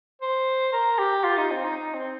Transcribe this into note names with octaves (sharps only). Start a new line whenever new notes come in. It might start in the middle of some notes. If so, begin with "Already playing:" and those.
C5
A#4
G4
F4
D#4
C4
D#4
D#4
C4